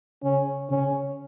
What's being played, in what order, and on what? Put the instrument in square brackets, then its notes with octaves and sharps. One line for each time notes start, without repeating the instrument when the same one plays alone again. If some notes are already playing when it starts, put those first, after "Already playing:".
[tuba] C#3 [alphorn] C#4
[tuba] C#3 [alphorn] C#4